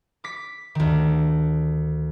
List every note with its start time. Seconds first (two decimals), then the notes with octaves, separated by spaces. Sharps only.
0.24 D6 B6
0.75 D2 D#3